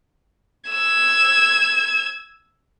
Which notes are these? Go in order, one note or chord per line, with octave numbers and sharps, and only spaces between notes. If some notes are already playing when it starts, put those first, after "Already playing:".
E6 G#6